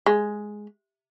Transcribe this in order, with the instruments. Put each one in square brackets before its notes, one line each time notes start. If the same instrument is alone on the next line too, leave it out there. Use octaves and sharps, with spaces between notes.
[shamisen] G#3